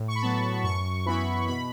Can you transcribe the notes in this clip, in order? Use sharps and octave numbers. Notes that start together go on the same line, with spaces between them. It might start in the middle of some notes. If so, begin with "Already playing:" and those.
Already playing: A2
C#6
B5
F#3 B3 A5
F#2 C#6
E3 B3 E4 B5
B2 B5